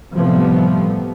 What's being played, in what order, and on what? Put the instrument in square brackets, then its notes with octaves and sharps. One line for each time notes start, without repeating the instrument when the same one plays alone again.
[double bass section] A2 C3 F3 G3 A3 B3